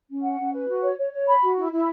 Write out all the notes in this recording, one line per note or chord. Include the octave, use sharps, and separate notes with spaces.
C#4
F#5
C#4
B4
F#4
C#5
C#5
C#5
B5
F#4
E4
E4